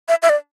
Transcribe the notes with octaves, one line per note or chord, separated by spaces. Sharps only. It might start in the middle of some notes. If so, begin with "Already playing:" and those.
E5
E5
D5